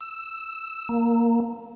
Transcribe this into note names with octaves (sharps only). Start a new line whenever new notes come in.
E6
A#3